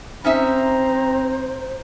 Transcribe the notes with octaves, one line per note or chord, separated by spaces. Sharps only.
C4 C#4 D#4 C5 E5 A#5